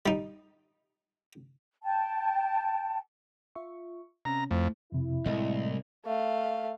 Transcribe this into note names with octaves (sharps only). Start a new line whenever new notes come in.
G3 D#4
G5 A5
F4 E5 C#6
C3 C#4 A#5
F2 A3 E4 C5
F2 C3 E4
C2 A2 G#3 A3 D#5
A3 F5